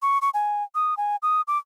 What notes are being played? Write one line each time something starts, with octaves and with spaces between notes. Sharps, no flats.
C#6
C#6
G#5
D#6
G#5
D#6
D6